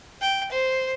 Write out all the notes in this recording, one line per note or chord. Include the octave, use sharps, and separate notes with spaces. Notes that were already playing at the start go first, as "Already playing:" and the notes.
G5
C5